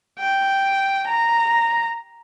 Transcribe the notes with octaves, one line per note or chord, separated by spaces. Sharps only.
G5
A#5